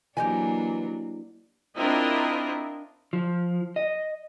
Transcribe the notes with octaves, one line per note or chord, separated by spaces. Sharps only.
E3 F#3 A#3 D4 G4 D#5 G#5
C4 D4 E4 F4 A#4 D#5
F3
D#5